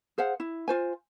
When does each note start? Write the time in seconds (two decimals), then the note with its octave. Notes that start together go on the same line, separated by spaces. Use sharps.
0.18 G#4 C5 F5 F#5
0.40 E4
0.68 F4 C5 G#5